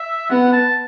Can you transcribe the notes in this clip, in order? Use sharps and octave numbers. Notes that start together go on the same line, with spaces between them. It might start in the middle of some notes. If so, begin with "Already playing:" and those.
Already playing: E5
B3 F#5
A5